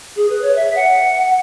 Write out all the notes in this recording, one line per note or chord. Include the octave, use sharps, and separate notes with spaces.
G#4
B4
C#5
E5
F#5